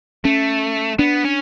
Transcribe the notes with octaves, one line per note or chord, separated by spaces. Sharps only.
A3 C#4
B3 D4
C#4